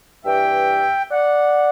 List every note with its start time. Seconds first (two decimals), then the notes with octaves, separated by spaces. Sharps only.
0.24 G2 E3 E5 G5
1.10 D5 F#5